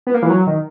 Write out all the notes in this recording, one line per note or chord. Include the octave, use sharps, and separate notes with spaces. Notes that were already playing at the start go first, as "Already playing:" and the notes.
B3
A#3
E3
F#3
D#3